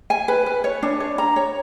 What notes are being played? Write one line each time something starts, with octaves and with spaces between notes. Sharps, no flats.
G#5
B4
B4
C#5
D4
C#5
A#5
C#5